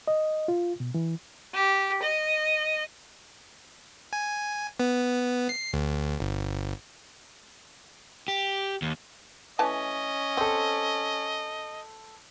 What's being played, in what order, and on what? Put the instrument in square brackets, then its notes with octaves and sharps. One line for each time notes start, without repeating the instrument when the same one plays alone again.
[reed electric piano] D#5
F4
B2
E3
[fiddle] G4
D#5
[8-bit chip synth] G#5
B3
C7
D2
G1
[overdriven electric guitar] G4
D#2
[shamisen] E3 A3 A5 [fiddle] C#4 [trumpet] D#5
[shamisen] C4 [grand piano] A4 C5